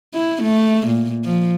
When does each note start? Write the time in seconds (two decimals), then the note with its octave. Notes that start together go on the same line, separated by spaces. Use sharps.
0.14 E4
0.43 A3
0.88 A#2
1.25 F3